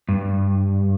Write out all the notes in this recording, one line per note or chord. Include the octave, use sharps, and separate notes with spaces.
G2